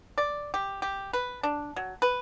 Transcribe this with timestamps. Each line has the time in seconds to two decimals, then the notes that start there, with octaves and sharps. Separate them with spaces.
0.18 D5
0.54 G4
0.82 G4
1.13 B4
1.43 D4
1.76 F#3
2.02 B4